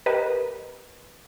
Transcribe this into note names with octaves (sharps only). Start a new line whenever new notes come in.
G4 A#4 B4 D#5